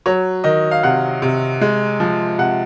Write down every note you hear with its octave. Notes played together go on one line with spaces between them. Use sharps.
F#3 C#5
D#3 D#5
F5
C3 F#5
C3
G#3
F3
C3 F#5